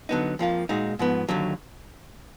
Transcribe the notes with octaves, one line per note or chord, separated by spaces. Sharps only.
D3 F#3 B3 D#4
F2 F3 A#3 F4
A#2 G#3 D#4 F#4
G#2 F3 B3
D#2 D3 F#3